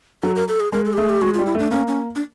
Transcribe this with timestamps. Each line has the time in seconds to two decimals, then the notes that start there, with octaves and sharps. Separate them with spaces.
0.23 F#3 A4
0.36 A#4
0.48 A4
0.60 G#4
0.72 G#3 A#4
0.85 A4
0.93 G4
0.98 A3 G#4
1.09 G4
1.22 G#3 F#4
1.34 F4
1.39 G3
1.46 E4
1.55 A3 D4
1.71 A#3 C#4
1.88 C#4
2.16 D4